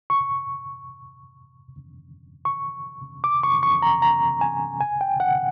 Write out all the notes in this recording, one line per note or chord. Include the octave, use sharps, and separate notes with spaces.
C#6
C#6
D6
C#6
C#6
A#5
A#5
G#5
G#5
G5
F#5